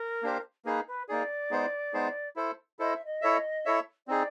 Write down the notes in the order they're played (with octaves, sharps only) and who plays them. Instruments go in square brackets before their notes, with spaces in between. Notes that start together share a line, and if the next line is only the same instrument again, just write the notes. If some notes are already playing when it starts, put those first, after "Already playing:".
Already playing: [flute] A#4
[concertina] A#3 D4 G4 C5
[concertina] A#3 D#4 G#4 [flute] B4
[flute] B4
[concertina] A#3 D#4 G#4 [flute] D5
[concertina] G#3 B3 D#4 G#4 C5
G#3 B3 D#4 G#4 C5
E4 A4 C5
[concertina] E4 A4 C5 [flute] D#5
[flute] E5
D#5
[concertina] E4 A4 C#5 E5
E4 A4 C#5 E5
[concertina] C4 D#4 G#4 [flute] D5